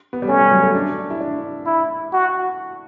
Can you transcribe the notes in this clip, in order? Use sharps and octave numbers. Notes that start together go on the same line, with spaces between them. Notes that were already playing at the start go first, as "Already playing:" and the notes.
B3
G3
A3 C#4
G3
F#3
A3
D4
E4
D4
E4
F#4